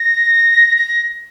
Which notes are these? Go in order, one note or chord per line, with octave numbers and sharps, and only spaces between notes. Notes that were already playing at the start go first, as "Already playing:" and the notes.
Already playing: A#6
A#6